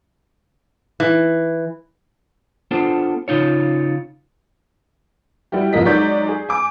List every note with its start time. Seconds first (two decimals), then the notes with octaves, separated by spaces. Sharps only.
1.00 E3
2.71 B3 D4 F4 A4 C5
3.28 C#3 D#4 F4 C#5
5.52 G3 E4 F#4 G4
5.73 F1 C2 F3 A#3 D#5 B6
5.85 F#3 G#3 D#4 D5 C#6 G6
6.29 G#4
6.49 G#5 D6